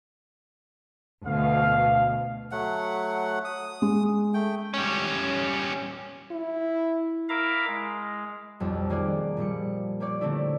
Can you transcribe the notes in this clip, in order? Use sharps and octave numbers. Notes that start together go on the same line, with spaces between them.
D2 B2 F5
F#3 A3 F#5
D#6
G#3
A3 G5
G3 C#4
E4
E4 A#4 E5 F5 A#5 D6
G#3
B1 F2 G3
D#3 A#3 F4 F#4 G#4 D5
A#2 F3 G3 C#7
A#3 G4 C#5 D5
D3 A3 C4 D4 E4